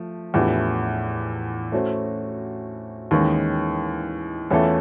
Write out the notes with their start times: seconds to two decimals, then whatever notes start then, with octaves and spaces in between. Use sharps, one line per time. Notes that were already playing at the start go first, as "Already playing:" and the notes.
Already playing: F3 A3
0.34 E2 A2 E3 F3 A3 D4 G4
1.72 A3 C#4 F#4 A4 C5
3.11 D#2 D#3 E3 G#3 C#4
4.50 E2 E3 A3 C#4 F4 A4